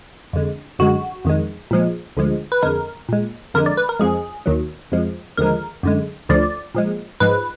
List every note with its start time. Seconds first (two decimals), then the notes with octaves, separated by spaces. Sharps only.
0.33 F2 D3 G#3
0.79 F#2 D3 G#3 F#4
1.25 F2 D#3 G#3
1.71 A#2 F3 G#3
2.17 D2 D3 F3 G#3
2.52 B4
2.62 F2 D3 G#3 A#4
3.09 A#2 G#3
3.54 F2 D3 G#3 A#4
3.66 D5
3.77 B4
3.89 A#4
4.00 F2 F3 G#3 G#4
4.46 D#2 D#3 F#3
4.92 F2 F3 G#3
5.37 D#2 D3 F3 G#3 A#4
5.83 F#2 D3 G#3
6.29 D2 D3 F3 D5
6.75 A#2 F3 G#3
7.20 G#2 F3 G#3 B4